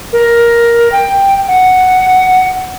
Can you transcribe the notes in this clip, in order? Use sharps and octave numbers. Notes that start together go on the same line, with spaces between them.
A#4
G5
F#5